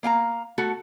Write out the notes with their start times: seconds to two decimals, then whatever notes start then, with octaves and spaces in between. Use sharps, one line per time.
0.03 A#3 F5 G5 A#5
0.58 A3 F#4 A4